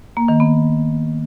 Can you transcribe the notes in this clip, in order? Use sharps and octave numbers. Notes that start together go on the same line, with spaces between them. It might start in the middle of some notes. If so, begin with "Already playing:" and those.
A#3
D#3
B3